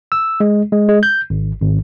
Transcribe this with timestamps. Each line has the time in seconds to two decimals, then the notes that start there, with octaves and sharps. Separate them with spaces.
0.12 E6
0.40 G#3
0.72 G#3
0.88 G#3
1.03 G6
1.30 G#1
1.60 G#1